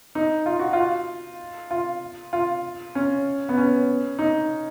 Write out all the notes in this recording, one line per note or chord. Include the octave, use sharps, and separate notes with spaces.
D#4
F4
F#4
F4
F4
F4
C#4
B3
C#4
D#4